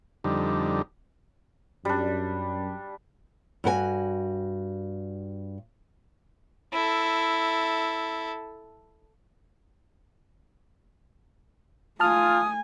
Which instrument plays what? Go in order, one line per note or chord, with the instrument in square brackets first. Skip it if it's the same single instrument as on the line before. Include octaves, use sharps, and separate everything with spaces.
[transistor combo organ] F2 D3 G3 D#4
[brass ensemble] F#2 [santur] G3 D4
[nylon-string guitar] G2 F#4 A#4 G#5
[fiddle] E4 A4
[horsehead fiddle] A3 G#5 [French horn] F4 [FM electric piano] A5 F6 [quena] D#6